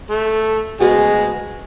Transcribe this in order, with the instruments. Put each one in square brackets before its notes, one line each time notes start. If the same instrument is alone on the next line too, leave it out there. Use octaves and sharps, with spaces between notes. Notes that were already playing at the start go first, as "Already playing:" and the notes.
[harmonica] A3
[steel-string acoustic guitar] D2 C#3 F#3 B3 F#4 [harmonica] G#3 G#4